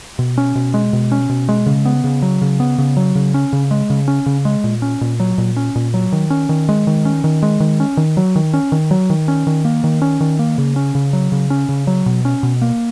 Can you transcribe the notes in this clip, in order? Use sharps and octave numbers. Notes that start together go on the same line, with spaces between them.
B2
C#4
B2
G#3
B2
C#4
B2
G#3
C#3
B3
C#3
F#3
C#3
B3
C#3
F#3
C#3
C#4
C#3
G#3
C#3
C#4
C#3
G#3
A#2
C#4
A#2
F#3
A#2
C#4
A#2
F#3
D#3
C#4
D#3
G#3
D#3
C#4
D#3
G#3
D#3
C#4
D#3
F#3
D#3
C#4
D#3
F#3
D#3
C#4
D#3
A#3
D#3
C#4
D#3
A#3
C#3
C#4
C#3
F#3
C#3
C#4
C#3
F#3
B2
C#4
B2
A#3